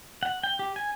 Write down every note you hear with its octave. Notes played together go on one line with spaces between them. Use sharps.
F#5
G5
G4
G#5